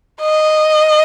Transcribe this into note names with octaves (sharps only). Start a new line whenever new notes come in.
D#5